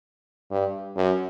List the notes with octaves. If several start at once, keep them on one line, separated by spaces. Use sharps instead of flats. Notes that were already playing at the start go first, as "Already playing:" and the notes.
G2
F#2